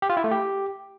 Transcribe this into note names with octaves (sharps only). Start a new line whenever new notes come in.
G4
F4
E4
A3
G4